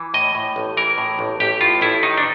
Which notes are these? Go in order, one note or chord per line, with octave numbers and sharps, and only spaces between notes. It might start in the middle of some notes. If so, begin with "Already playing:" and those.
Already playing: E3
A2 D#5
A2
A1
E3 A#4
A2
A1
A1 G4
A2 F4
A1 E4
D#3 D#4
D4